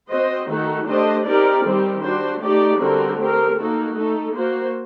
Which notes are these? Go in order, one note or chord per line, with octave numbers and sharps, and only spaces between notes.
C4 F#4 C5 D#5
D#3 A3 D#4 F#4 A4
A3 D4 G4 C5 D#5
C4 D#4 G4 A#4 D5
D#3 G3 C4 G4
G3 D4 F#4 C5
A3 D#4 G4 D5
D3 G3 C4 F#4 A#4
A3 C4 G4 A#4
A#3 D#4 F#4 A4
A3 D#4 A4
A#3 F#4 C5